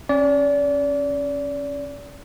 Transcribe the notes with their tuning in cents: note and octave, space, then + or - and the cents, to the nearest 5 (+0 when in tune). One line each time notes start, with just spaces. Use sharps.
C#4 -20 D5 -30